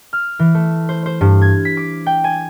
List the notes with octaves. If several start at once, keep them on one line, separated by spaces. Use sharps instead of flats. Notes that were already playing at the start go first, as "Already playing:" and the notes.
F6
E3
A3
C5
C5
G2
G#6
B6
D6
G5
G#5